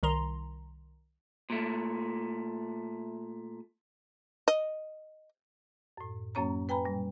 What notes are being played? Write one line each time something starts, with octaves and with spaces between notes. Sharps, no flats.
C2 D#3 A#5 C6
A#2 A3
D#5
F#2 A2
F#2 F#3 A#3 C#4 C#5 A#5
B4 G5 G#5 A#5 B5
A#2 G3